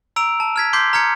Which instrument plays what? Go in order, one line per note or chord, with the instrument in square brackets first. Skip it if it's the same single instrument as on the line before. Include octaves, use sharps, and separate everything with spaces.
[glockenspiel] A#5 E6 D7 F7
A5
F6 G#6 B6
C6 D6 G6 B6 C7
A#5 F6 G#6 C#7